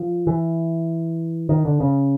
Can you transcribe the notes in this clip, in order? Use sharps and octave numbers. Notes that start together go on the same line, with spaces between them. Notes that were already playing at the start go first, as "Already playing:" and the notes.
Already playing: F3
E3
D#3
D3
C#3